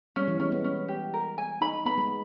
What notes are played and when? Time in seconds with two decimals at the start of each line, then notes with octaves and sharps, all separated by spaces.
0.16 G3 C#4
0.28 E3
0.40 G#3 C#4
0.52 B3
0.64 C#4
0.88 G4
1.14 A#4
1.38 G#5
1.61 D#4 B5
1.86 B3 B5
1.98 G#3